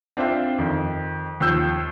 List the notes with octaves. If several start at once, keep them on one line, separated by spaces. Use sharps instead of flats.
C4 D4 F4 C5 E5 G5
F2 D#3
D#2 F3 E6 G6